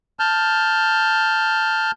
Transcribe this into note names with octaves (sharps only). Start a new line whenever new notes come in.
A5 F6 G6